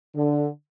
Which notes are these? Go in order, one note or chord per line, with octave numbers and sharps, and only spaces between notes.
D3